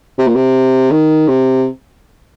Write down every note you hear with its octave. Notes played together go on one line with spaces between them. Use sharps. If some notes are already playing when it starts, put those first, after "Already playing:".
C3
A#2
C3
D#3
C3